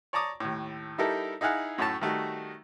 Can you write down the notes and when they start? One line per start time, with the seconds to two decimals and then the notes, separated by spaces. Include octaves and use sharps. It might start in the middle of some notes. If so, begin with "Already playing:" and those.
0.13 C#5 D5 A5 A#5 D6 D#6
0.40 D#2 A2
0.98 G3 D#4 E4 G4 A4 A#4
1.41 D#4 E4 G#4 F5 F#5 G#5
1.78 F#2 A2 A3 C#5 A5
2.01 D#3 G3 A3 D#4 F#4